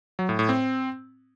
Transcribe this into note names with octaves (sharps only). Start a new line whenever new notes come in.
F#3
A2
A2
C4